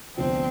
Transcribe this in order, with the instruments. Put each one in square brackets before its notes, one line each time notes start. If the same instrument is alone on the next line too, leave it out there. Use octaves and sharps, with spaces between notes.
[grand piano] D2 C3 F3 B3 D4 [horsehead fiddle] C4